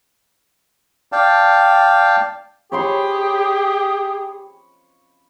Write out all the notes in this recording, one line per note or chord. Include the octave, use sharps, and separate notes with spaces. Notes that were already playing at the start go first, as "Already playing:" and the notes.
D5 F5 G5 A5
G4 G#4 C#5 B5 C6